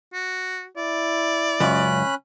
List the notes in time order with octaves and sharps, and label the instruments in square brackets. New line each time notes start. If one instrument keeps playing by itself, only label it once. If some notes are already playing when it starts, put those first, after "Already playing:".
[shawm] F#4
[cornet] E4 [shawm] D5
[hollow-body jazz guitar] C#2 F#2 [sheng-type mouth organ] C#4 B5 F#6